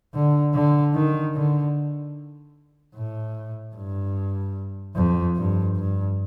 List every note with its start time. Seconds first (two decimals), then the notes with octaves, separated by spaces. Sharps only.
0.14 D3
0.54 D3
0.94 D#3
1.34 D3
2.95 A2
3.75 G2
4.96 F2
5.36 G2
5.76 G2